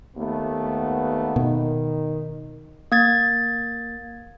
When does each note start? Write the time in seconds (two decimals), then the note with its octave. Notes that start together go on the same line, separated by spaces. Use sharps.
0.16 D#2 A3 B3
1.36 B2 D#3
2.92 A#3 G#6 A6